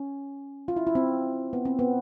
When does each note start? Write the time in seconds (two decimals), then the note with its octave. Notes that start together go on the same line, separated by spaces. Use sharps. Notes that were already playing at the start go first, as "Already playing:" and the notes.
Already playing: C#4
0.68 F4
0.76 E4
0.87 E4
0.95 C4
1.53 B3
1.65 C4
1.79 B3